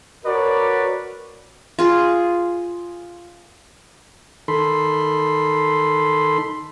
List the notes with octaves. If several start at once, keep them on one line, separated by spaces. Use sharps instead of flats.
F#4 A#4 B4 C#5 D5
F4 G#4
D#3 A4 B5 C6